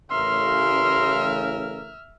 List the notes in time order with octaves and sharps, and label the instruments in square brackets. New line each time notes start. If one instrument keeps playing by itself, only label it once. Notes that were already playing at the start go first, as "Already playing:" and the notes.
[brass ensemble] A1 C#3 A#4 [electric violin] E5 F6 [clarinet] C6